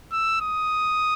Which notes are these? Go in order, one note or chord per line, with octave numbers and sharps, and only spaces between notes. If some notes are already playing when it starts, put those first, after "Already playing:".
E6
D#6